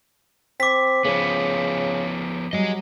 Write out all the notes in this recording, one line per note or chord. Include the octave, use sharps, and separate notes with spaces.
C4 D6 B6
C#3 F3 B3 B4 C#5
F#3 G3 G#4 D#5